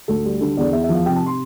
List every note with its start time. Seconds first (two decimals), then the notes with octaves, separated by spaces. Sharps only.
0.08 D2 A4
0.25 G3
0.41 D3 A4
0.57 E2 D5
0.73 E2 E5
0.83 E5
0.89 F3
0.95 F5
1.05 C3 G5
1.16 A5
1.26 C6